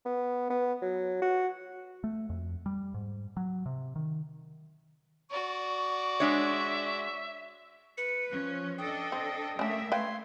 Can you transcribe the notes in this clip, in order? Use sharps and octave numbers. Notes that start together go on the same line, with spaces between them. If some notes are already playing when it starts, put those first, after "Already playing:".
B3
B3
F#3
F#4
A3
F2
G3
G#2
F#3
C3
D#3
F#4 D5 C#6
G#3 D4 C#5 E5
B4 C#7
F3 C#4 F#6
D4 A4 D#5 G5 D#6
C4
A3 A#3 C#4 D4 E5
A3 B4 F5 G5 C6 G#6